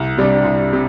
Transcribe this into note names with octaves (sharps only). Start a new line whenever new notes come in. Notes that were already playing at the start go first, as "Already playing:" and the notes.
Already playing: C2
C3 G3 D4
C2
C3